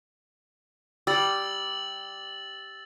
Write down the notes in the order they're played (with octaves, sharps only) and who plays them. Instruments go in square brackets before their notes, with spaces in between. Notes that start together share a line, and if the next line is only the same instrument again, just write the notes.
[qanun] G3 [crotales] E6 A6 F#7